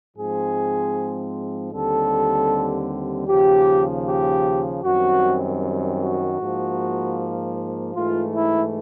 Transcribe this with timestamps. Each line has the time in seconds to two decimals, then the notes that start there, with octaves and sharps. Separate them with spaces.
0.17 G#2 F3 G#3 C4 G#4
1.72 D#2 D3 G3 C4 A4
3.28 D#2 C#3 F3 G4
4.06 G4
4.84 F#2 D#3 G3 C4 F#4
6.00 F#4
6.39 G#2 F3 A#3
7.95 G#2 E3 A3 F4
8.34 E4